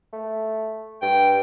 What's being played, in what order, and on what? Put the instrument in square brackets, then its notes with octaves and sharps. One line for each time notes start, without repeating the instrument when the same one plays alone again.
[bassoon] A3
[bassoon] G2 [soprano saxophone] G5